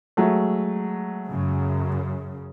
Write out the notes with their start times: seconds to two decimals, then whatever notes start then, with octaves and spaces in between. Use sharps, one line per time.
0.17 F#3 G#3 A3
1.27 F#2 C#3